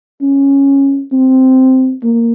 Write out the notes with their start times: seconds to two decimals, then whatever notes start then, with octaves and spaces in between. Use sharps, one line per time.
0.22 C#4
1.12 C4
2.04 A#3